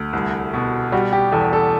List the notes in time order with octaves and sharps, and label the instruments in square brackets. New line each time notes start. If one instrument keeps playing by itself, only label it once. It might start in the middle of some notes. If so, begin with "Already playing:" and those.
Already playing: [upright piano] D2
C2
B2
[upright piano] G3 [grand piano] F#4
[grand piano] G4
[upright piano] E2 [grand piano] A4
[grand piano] A4